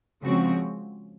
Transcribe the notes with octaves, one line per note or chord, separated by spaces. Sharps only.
C#3 F3 G#3 C4 F#4